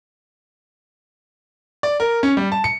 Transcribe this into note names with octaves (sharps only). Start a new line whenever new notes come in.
D5
A#4
C#4
G3
A5
C#7